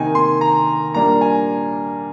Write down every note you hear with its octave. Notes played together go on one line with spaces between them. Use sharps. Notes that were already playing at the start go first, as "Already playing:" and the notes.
Already playing: C3 D#3 A#3 D#4 G#5
C6
A#5
A#2 G3 A#3 D4 A#5
G#5